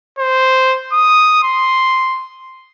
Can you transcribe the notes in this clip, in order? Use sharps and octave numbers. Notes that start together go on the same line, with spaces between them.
C5
D#6
C6